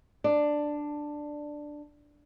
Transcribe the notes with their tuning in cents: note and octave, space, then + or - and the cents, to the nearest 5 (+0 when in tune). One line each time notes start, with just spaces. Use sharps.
D4 +5 D5 +10